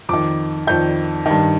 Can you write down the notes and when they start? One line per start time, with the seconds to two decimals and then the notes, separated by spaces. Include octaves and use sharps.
0.09 F2 D6
0.13 D#3
0.67 F2 D#3 G6
1.26 G2 D#3